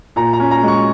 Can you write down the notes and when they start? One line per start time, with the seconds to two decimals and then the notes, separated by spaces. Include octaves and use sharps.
0.16 A#2 A#5
0.33 A#5
0.40 C#4
0.51 A#5
0.63 G#3
0.68 C#6